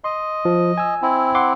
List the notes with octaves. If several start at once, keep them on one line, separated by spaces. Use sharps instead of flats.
D#5 C6
F3
G#5 E6
C4 E4
F#5 C6 D6